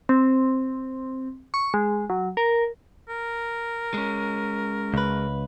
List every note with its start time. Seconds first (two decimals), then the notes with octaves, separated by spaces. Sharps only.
0.09 C4
1.54 C#6
1.74 G#3
2.10 F#3
2.37 A#4
3.09 A#4
3.94 G#3 C#4
4.94 C#2 B4